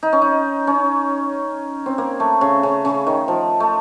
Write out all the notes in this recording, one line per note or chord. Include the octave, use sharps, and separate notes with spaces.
D#4
C#4
D#4
C#4
C4
A#3
A3
C#3
C#3
C#3
D#3
F3
A3